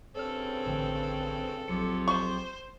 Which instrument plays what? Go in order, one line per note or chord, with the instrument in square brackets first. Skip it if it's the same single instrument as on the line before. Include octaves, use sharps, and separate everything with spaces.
[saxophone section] G2 C#3 C4 [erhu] A4 [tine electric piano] C5 C#5 F6
[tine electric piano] A1 D3 G5
[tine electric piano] A#1 F#3 C#7 [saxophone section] F2 G4 G#4
[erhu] C5 [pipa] C#6